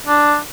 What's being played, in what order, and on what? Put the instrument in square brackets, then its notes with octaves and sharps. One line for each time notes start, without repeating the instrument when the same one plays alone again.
[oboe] D4